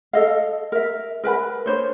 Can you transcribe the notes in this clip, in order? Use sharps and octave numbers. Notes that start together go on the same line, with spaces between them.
A4 D#5 F5
A#4 E5
A#4 B4 G#5 B5
D4 C5 C#5